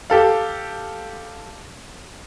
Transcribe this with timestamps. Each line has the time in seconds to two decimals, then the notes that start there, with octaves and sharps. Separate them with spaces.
0.10 G4 A4 F5